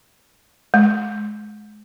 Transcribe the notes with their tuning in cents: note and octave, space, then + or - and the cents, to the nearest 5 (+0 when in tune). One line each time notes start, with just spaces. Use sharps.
G#3 +25